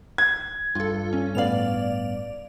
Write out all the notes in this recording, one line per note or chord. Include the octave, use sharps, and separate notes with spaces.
G#6
G2 F4 A4
C#4
A2 B3 D5 F5 F7